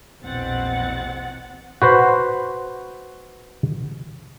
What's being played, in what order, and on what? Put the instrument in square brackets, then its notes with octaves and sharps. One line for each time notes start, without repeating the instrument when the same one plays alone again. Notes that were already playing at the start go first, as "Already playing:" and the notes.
[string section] A#1 E2 B2 C4 F#5 A6
[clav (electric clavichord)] F#4 B4 C5